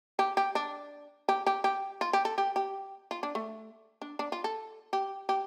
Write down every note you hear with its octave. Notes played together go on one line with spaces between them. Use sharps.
G4
G4
D4
G4
G4
G4
F4
G4
A4
G4
G4
F4
D4
A3
D4
D4
F4
A4
G4
G4